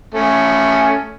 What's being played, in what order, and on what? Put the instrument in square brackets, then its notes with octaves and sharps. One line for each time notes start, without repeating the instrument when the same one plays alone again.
[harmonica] A3 C#4